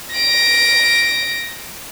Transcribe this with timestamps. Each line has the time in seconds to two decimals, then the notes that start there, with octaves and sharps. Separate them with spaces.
0.14 A#6 D7